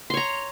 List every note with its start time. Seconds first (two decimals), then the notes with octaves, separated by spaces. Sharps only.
0.10 C6
0.14 C#5
0.17 A#5